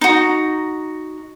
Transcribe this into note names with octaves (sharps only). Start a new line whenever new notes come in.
D#4 F#4